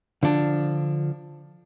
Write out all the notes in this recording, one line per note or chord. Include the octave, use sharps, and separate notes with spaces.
D3 F3 D4